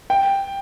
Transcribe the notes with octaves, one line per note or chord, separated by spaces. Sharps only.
G5